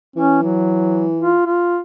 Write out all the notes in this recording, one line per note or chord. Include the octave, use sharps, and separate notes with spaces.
E3 C#4
F#3
F4
F4